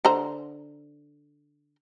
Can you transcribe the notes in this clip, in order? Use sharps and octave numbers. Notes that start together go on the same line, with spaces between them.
D3 C5 A#5